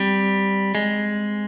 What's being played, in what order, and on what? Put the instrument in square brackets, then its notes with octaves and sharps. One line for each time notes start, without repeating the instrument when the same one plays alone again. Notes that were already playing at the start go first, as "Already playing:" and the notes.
Already playing: [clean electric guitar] G3 [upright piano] C4
[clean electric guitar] G#3